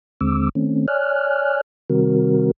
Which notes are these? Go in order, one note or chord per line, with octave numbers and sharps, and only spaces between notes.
D#2 D3 G#3 C4 D6 E6
D#3 A3 C4 C#4
C#5 D5 G#5 F6 F#6
C3 D#3 G3 C4 F#4 A#4